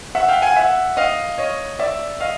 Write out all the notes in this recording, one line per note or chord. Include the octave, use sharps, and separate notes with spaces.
E5 F#5
F5 G5
F#5 G#5
E5 F#5
D#5 F5
C#5 D#5
D5 E5
D#5 F5